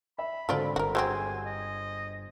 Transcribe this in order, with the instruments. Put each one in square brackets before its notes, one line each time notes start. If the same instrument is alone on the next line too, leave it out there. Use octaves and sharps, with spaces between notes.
[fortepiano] E5 [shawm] B5
[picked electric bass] G#2 D3 [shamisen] F#3 F4 D5 [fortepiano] C4 A4
[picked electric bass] G1 [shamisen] F#4 A#4
[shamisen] F#3 G#3 C4 [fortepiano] G#4 C5 [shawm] G#5
[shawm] D#5